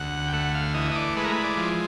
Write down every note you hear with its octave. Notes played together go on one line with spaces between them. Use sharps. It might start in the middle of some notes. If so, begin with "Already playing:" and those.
Already playing: D2 F#5
G5
A3 F#5
F5
E3 D#5
D#5
D5
G#3 B4
A#4
B4
D5
F3